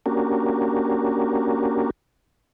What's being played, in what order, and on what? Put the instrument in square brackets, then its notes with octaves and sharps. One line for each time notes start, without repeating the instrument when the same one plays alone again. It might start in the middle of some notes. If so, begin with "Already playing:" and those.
[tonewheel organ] A#3 C#4 D4 F#4 G4 A#4